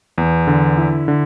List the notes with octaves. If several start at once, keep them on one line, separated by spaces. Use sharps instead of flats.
E2
D3
E4
D3